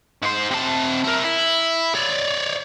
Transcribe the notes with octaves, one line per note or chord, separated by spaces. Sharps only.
G#2 C5
C3 A5
E4 A#4
E4
C#5 D5